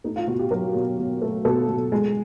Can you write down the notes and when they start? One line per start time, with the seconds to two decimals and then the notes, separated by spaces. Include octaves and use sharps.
0.04 A3 D#4
0.16 F4
0.27 B2 F#4
0.39 G4
0.51 F#3 A#4
0.75 B2
0.99 B2
1.22 A3
1.45 B2 A4
1.68 B2
1.92 G#3